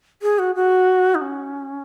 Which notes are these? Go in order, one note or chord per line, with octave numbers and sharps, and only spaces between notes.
G#4
F#4
F#4
D#4
C#4